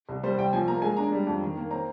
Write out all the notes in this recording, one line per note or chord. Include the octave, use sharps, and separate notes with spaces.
C2
G3 C5
C2 G5
F3 G#5
A#3 A#5
G#3 G#5
D4 A#5
G3
F2
D#3
A#3
C4 A#5